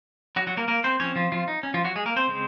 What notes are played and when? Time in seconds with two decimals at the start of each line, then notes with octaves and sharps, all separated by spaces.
0.36 F#3 F#4
0.47 F#3 F#4
0.57 A#3 A#4
0.68 A#3 A#4
0.84 C4 C5
1.00 F3 C4 C#4 C#5
1.16 F3 F4
1.32 F3 F4
1.48 D#4
1.63 C#4
1.74 F3 F4
1.84 F#3 F#4
1.96 G#3 G#4
2.06 A#3 A#4
2.16 C4 C5
2.27 C#3 G#3 C4